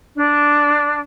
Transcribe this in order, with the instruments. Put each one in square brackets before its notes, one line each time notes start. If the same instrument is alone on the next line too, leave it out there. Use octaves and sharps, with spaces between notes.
[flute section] D4